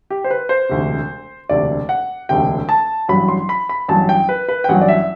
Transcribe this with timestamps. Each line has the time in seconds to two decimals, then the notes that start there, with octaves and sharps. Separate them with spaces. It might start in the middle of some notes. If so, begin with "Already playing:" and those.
0.10 G4
0.24 C5
0.31 B4
0.49 C5
0.69 E1 D2 C3
1.49 E1 D2 C3 D5
1.89 F#5
2.29 E1 D2 C3 G5
2.69 A5
3.09 A1 G2 F#3 B5
3.28 C6
3.49 B5
3.69 B5
3.88 A1 G2 F#3 A5
4.09 G5
4.29 B4
4.48 B4
4.64 G5
4.68 A1 G2 F#3 F#5
4.81 D5
4.88 E5